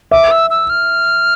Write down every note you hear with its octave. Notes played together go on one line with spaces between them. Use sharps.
E5 D6
E6
E6
F6